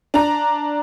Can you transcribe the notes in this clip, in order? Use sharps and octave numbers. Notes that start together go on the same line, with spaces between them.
D4 A#5